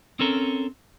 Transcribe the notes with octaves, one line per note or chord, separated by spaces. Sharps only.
C4 C#4 A4 A#4